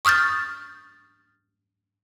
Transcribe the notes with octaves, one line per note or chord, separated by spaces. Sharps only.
C#6 D#6 F6 G6 A6